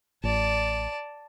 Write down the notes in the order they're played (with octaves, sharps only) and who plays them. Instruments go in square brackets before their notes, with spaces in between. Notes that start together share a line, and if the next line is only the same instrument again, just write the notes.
[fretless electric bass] A1 [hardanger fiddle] D5 A5